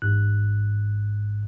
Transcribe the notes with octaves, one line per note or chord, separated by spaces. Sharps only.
A1 G#2 F#6